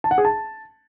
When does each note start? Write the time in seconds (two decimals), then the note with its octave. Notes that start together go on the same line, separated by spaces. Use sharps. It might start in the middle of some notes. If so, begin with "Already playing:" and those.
0.04 A5
0.11 F#5
0.18 G#4
0.25 A5